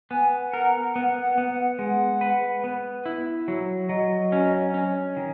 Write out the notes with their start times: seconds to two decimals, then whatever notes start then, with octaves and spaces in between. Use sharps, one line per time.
0.11 B3 G#5
0.52 A#4 F#5
0.95 B3 F#5
1.23 F#5
1.38 B3
1.52 F#5
1.79 G#3 F#5
2.21 B4
2.64 B3
3.06 E4
3.48 F#3
3.89 F#3 D#5
4.32 C#4
4.74 C#4
5.17 D#3